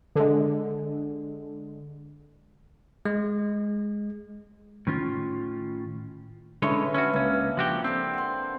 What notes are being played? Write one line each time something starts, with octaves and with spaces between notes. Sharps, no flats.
D3 G#3
G#3
A2 D#3 C#4 F4
D3 G#3 C#4 E4 B4 C#5
C#4 D4 F#4 E5
C#2 A#3 C#4
F3 F#4 G4
C4 G4 A4 D5
F#5 C6